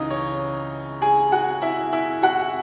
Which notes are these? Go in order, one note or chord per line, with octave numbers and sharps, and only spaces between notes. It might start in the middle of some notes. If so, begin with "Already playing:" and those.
Already playing: C#2 C#3 E3 D#4 D#5
C#5
G#4 G#5
F#4 F#5
E4 E5
E4 E5
F#4 F#5